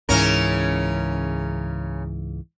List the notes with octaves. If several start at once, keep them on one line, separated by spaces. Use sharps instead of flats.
C#2 G#2 C#3 E3 C#4 A#4